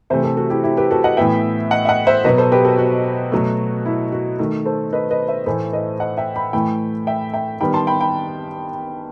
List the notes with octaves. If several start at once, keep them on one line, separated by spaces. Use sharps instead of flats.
C3 E3 A3 C5 E5
A4 C5
F#4 A4
E4 G4
E4 G4
G4 B4
F#4 A4
D#5 F#5
A2 E3 B3 E5 G5
D#5 F#5
E5
D#5 F#5
C5 E5
B2 F#3 B3 B4 D#5
A4 C5
G4 B4
F#4 A4
F#4
B2 F#3 A3
E4
F#4
D#3 A3
A4 C5
B4 D#5
B4 D#5
C5 E5
A2 E3 A3 A4 C5
B4 D#5
D#5 F#5
E5 G5
G5 B5
A2 E3 A3 G5 B5
E5 G5
E5 G5
D#3 G3 B3 G5 B5
A5 C6
G5 B5
G5 B5